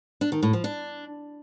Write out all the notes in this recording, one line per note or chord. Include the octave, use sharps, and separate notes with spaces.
D4
D#3
A2
F3
D4